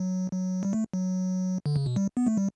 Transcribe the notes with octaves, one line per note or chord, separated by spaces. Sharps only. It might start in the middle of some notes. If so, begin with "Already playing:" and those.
Already playing: F#3
F#3
G3
A3
F#3
D3
C#3
B2
G3
B3
A3
G3